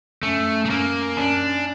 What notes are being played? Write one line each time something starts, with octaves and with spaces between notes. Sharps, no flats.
F#2 A3
A3
F#2 A#3
F#2 D4